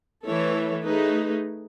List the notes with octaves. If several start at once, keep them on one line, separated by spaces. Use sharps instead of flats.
E3 A3 E4 A4 C#5
A3 D#4 G#4 B4